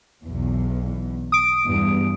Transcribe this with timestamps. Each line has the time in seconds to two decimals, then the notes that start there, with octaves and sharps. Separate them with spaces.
0.24 B1 E2
1.32 D#6 D7
1.66 E2 G2